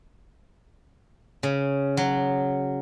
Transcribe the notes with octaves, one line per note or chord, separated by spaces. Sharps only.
C#3
F#3